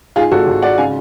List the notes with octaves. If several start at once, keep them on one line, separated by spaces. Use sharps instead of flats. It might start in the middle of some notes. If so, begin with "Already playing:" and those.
G#2 F4 G#4
G#1 F#4 A4
G#1
G#2 D5 F#5
C#3 F5 G#5